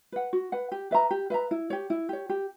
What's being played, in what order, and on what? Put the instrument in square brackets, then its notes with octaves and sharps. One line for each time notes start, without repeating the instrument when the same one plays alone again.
[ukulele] B4 F#5
F#4
B4 F#5
G4
B4 E5 A#5
G4
B4 E5 A#5
E4
G4 C#5
E4
G4 C#5
G4